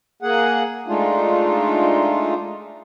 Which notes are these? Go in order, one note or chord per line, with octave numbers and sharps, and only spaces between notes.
A#3 G#4 F#5
G#3 A3 D4 D#4 F4